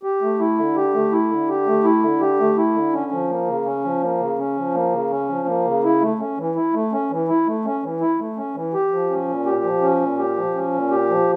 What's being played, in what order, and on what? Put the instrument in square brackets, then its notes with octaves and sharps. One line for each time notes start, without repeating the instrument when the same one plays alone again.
[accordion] G4
A3
E4
D3
G4
A3
E4
D3
G4
A3
E4
D3
G4
A3
E4
D3
C#4
F3
A#3
C#3
C#4
F3
A#3
C#3
C#4
F3
A#3
C#3
C#4
F3
A#3
C#3
E4
A3
C#4
E3
E4
A3
C#4
E3
E4
A3
C#4
E3
E4
A3
C#4
E3
G4
F3
C#4
A#2
G4
F3
C#4
A#2
G4
F3
C#4
A#2
G4
F3